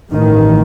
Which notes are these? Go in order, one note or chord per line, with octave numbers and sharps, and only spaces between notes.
A1 G2 D#3